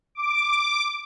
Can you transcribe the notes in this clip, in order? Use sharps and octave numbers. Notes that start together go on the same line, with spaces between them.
D6